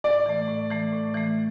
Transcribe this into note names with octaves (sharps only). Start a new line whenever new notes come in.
A2 D5
E3 A3
A2
E3 A3
A2
E3 A3